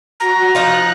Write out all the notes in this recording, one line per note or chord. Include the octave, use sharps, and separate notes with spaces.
F#4 A#5
F3 D#4 F4 F#6